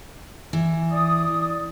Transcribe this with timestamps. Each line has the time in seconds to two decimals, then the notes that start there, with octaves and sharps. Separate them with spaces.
0.53 E3
0.91 D5 D#6